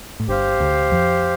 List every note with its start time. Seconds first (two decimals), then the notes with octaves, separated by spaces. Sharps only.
0.20 A2
0.28 G1 G2 G4 C5 F5
0.60 D2 D3
0.92 F2 F3